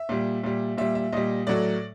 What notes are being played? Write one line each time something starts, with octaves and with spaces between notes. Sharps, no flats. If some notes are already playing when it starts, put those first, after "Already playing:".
Already playing: E5
A#2 G3
A#2 G3
A#2 G3 E5
E5
A#2 G3 D#5
A2 F#3 A3 D5